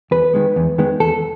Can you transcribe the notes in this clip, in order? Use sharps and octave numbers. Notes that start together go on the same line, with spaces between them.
E2 B4
D#3 G#3 B3
E2
D#3 G#3 B3
E2 A4